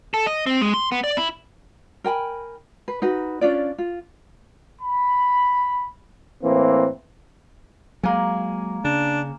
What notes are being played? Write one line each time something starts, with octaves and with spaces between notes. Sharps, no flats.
A4
D#5
C4
G#3
C6
B3
D5
E4
A#4 G5 G#5 B5
B4
D#4 F#4 B4
C#4 D4 F4 D5
F4
B5
A2 E3 A#3 C4
F#3 G#3 A#3 G#5
C#3 D4